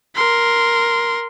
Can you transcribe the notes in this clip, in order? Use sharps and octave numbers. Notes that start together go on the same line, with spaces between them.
A#4 C6